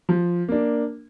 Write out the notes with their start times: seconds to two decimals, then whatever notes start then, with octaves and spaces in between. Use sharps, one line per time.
0.09 F3
0.49 A#3 D4